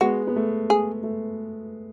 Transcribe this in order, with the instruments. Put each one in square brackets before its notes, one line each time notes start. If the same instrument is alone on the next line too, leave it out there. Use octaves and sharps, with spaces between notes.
[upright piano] G#3 B3 [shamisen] F#4
[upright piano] B3
A3
[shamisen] G#4
[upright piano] A3